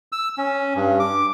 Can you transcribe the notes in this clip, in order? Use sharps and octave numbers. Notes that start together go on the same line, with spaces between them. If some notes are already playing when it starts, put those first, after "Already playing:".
E6
C#4
G2
D6